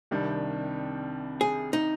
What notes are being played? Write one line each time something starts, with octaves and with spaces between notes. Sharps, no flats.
C2 C3 D#3 G3 D4
G#4
D#4